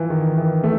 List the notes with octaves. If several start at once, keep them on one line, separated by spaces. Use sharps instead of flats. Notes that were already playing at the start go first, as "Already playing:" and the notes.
Already playing: E3 F3
D#3
E3
A3